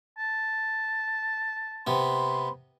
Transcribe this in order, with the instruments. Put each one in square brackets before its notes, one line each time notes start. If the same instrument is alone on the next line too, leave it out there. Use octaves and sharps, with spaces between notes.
[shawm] A5
[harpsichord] C3 B3 [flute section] B5 C6